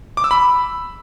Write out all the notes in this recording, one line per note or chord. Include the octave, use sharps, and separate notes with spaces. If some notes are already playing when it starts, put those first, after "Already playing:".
D6
E6
B5